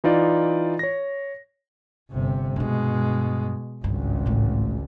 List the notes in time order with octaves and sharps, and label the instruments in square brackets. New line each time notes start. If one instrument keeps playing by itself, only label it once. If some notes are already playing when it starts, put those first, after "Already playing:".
[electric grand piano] E3 D#4 F4 D5
C#5 A#6
[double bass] G1 C3
[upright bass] G2 D4 [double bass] B2 G#3
[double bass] G#1 C#2 [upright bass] G2
[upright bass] A1 A2